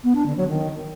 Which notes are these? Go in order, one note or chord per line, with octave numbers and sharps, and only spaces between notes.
B3
D4
D3
F#3
D#3